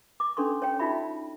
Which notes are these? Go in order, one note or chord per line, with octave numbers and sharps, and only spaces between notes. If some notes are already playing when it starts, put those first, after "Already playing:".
D6
C#4 D4 A4 C6 C#6
C#5 G5
D#4 F4 F#4 D5 E5 B5